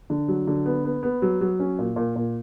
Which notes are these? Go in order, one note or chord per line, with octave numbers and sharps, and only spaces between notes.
D3
F#3
D3
B3
B3
B3
F#3
F#3
C#4
A#2
A#2
A#2